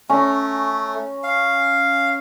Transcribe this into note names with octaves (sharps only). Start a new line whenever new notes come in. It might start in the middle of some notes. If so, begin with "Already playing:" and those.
A3 C#4 A#5
F5